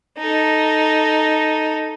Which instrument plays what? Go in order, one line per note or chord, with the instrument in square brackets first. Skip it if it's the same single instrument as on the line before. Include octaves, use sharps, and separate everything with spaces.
[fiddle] D#4 A4